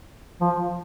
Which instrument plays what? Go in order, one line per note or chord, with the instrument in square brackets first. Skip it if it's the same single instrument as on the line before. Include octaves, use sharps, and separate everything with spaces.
[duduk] F3